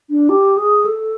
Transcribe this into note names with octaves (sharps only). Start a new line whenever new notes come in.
D4
G4
G#4
A4